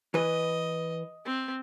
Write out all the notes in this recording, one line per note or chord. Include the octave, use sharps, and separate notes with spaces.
E3 B4 D#5
C4